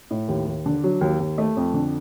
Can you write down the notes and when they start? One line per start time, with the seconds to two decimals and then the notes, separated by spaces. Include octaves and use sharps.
0.11 A2
0.28 D#2
0.46 D#2
0.66 D3
0.84 F#3
1.01 D#2
1.20 D#2
1.38 A3
1.57 F2
1.74 D3